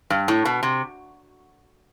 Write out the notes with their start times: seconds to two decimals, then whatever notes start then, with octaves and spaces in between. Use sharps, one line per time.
0.10 G2
0.28 A2
0.45 B2
0.63 C3